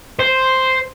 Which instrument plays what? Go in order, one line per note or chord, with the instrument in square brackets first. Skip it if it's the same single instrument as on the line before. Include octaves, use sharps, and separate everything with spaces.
[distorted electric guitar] C5